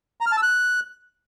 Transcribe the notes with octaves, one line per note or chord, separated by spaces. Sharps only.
A#5
F6
A5
E6
F#6